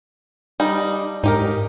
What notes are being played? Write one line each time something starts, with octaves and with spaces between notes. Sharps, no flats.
G3 D4 D#4
G#2 D#4 G4 A#4